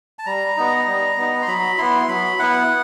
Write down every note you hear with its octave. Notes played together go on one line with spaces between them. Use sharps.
A5
G3 A#5
B3 D#4
G3
B3 D#4
C6
F#3 B5
B3 E4 C6
F#3 B5
B3 E4 F#5